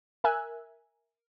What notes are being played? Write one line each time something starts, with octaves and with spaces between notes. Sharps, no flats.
A#4 E5 G#5 E6 F#6